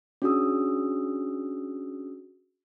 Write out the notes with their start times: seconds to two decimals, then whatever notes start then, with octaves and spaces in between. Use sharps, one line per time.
0.22 C#4 D4 F#4 G#4 D#6 E6